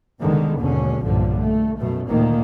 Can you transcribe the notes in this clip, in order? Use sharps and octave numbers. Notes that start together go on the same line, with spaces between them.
C2 D3 D#3 G#3 B3
D#2 G#2 B2 D3 C#4
B1 G2 A#2 D3 F3
A3
F#2 B2 A3
D2 A#2 D#3 A#3